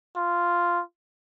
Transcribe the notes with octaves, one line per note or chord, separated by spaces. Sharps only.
F4